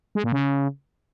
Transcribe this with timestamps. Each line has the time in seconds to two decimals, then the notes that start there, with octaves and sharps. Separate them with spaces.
0.15 G#3
0.24 A#2
0.32 C#3